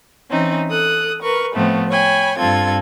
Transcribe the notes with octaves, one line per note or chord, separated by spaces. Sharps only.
E3 C4 C#4 D#4
A4 D#6 F#6
A#4 B4 C#6
A2 F3 A3 B3 C4
C#5 G5 G#5 B5
G2 C4 F4 A4 G#6